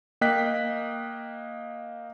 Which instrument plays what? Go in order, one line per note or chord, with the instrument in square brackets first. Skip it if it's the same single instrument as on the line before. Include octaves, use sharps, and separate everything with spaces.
[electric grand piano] A#3 D#5 G5 F#6 B6